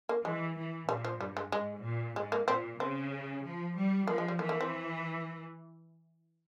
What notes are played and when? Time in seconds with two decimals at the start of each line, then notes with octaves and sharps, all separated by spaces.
0.09 A#3
0.25 E3 G#3
0.57 E3
0.89 A#2 G3
1.05 F3
1.21 G2 G3
1.37 G#3
1.52 G#2 G#3
1.84 A#2
2.16 G#2 G#3
2.32 A#3
2.48 A#2 C4
2.79 C#3 C4
3.43 F3
3.75 G3
4.07 F3 A#3
4.18 G#3
4.28 G3
4.39 E3 A#3
4.49 A#3
4.61 C4